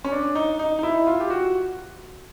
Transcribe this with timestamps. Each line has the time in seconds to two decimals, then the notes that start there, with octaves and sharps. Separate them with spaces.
0.04 C#4
0.12 D4
0.35 D#4
0.59 D#4
0.79 D#4
0.83 E4
1.07 F4
1.20 G4
1.30 F#4